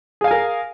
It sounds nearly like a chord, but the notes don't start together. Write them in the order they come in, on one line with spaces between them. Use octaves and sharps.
G#4 F5 G#5 A#4